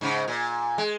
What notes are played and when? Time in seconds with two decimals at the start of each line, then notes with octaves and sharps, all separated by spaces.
0.01 G#2 C#3
0.28 A#2
0.78 G#3